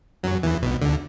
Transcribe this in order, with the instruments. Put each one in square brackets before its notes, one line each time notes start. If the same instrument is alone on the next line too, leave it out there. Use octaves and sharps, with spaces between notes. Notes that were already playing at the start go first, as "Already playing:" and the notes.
[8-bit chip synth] F#2 F#3
E2 E3
B1 B2
D2 D3